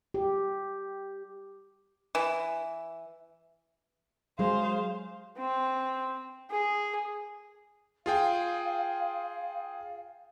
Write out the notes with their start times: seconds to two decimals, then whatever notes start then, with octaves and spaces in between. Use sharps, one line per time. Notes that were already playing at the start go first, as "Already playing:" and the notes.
0.14 G4
2.15 E3
4.39 F#3 G#3 G#4 C5 F5
5.38 C4
6.51 G#4
8.06 F4 G#4 F5 G5